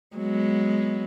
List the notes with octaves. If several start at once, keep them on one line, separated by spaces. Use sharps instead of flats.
F#3 G#3 B3